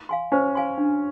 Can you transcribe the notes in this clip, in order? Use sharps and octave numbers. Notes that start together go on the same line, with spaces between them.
F5 G#5 C6
C#4 C5
F5 G#5 C6
D4